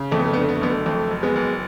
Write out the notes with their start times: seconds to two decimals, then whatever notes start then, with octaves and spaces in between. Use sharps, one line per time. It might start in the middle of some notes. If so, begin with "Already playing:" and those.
Already playing: C#3
0.12 F2 A3
0.19 B3
0.26 A3
0.33 B3
0.36 D3
0.42 A3
0.49 B3
0.56 A3
0.61 F#1 B3
0.70 A3
0.86 F2 A3
1.11 F#1
1.23 G#3 B3
1.36 F#1